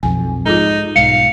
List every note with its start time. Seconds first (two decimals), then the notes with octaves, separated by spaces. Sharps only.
0.03 B1 F2 G#5
0.46 G#2 D#4 F4 G#4 A4
0.96 B1 G#2 F5 C#7